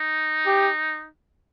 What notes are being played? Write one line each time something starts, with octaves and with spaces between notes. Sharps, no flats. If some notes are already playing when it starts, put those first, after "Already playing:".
Already playing: D#4
G4